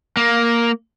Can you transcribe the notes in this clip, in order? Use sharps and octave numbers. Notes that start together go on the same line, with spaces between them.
A#3